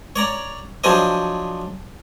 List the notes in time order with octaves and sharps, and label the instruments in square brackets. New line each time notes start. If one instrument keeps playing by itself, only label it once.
[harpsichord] C#5 D5 A#5
F3 F#3 D4 G#4 C5 D#5